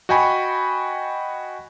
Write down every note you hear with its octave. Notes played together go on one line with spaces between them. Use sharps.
F#4 D#5 G5 G#5 B5 C#6